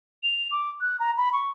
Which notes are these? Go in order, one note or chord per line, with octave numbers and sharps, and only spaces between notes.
F7
D6
F#6
A#5
B5
C#6